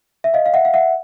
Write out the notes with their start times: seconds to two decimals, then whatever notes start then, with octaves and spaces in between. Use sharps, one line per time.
0.24 E5
0.34 D#5 F5
0.46 F5
0.54 E5 F#5
0.65 F5
0.74 E5 F#5